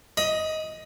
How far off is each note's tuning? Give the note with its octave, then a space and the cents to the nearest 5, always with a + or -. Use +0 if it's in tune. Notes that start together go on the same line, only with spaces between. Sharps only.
D#5 +10 B5 -30